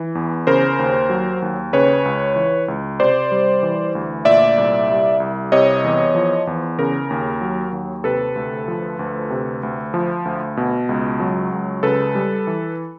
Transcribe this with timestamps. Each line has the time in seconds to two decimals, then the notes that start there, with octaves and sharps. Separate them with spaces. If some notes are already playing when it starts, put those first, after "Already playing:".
Already playing: E3
0.15 E2
0.47 C#3 A#4 C5
0.79 D#2
1.10 F#3
1.42 D#2
1.73 C#3 B4 C#5
2.05 C#2
2.36 E3
2.68 C#2
3.00 C3 C5 D5
3.32 G3
3.63 E3
3.95 D2
4.25 A#2 D5 E5
4.58 C2
4.89 G3
5.20 C2
5.52 C3 C#5 D#5
5.84 E2
6.15 F3
6.47 E2
6.78 C#3 A#4
7.10 D#2
7.41 F#3
7.72 D#2
8.04 C3 A4 B4
8.36 D2
8.68 F3
8.99 D2
9.30 C3
9.63 D2
9.94 F3
10.25 D2
10.57 B2
10.89 C#2
11.20 F#3
11.52 C#2
11.83 C#3 A4 B4
12.15 G3
12.47 E3